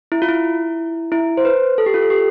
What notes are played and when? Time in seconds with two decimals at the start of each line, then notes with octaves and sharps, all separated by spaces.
0.12 E4
0.22 F4
0.29 E4
1.12 E4
1.37 C5
1.45 B4
1.78 A4
1.86 G4
1.94 F4
2.02 A4
2.10 G4